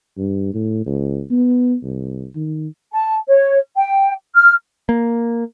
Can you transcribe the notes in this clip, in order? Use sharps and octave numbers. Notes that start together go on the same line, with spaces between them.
G2
A2
C#2
B3
C2
D#3
A5
C#5
G5
F6
A#3